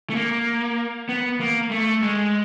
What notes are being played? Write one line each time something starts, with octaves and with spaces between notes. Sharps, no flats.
A3
A#3
B3
A#3
A3
G#3